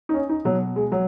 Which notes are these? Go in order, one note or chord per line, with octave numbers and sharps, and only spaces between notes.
D#4
C#4
D#4
B2 F#3
G#3
F#3